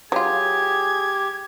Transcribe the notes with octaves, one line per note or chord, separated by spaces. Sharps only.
F#3 F4 G4 G#4 G#6